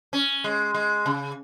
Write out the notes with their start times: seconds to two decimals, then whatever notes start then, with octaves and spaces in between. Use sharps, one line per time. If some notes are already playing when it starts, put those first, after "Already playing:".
0.13 C#4
0.44 G#3
0.74 G#3
1.06 C#3